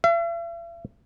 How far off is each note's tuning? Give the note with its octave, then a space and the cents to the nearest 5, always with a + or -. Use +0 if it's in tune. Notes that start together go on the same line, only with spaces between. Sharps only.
E5 +45